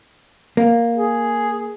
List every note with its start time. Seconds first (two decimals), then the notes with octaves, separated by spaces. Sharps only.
0.57 A#3
0.95 G#4